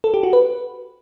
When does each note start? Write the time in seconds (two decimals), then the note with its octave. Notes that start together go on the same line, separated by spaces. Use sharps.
0.04 A4
0.14 G4
0.23 F#4
0.33 B4